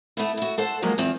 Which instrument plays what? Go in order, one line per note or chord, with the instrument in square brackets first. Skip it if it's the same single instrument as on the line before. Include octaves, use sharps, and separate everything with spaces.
[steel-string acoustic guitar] A3 B3 E4
E4 F#4
A4 C5 F#5
F3 F#3 G#3 A#3
E2 C4 F4 F5